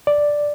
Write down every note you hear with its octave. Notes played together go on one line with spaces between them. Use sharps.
D5